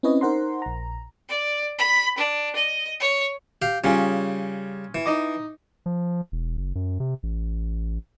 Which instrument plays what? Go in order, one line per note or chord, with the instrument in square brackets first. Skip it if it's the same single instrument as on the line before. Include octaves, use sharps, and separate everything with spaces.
[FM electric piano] C4 C#4 E4 B4 C#5 D#5
D#4 A#4 C5 F#5 A#5 C6
A#1 A#5
[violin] D5
B5
D4
D#5
C#5
[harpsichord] G4 F5
[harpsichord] C#3 G3 [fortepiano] C#4 F4 G#4
[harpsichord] E3
[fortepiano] D#4 D#5 D6
[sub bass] F3
E1
F#1
F#2
C3
A1